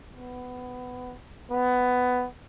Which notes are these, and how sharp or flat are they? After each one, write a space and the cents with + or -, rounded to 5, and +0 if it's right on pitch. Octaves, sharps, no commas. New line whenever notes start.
B3 +15
B3 +15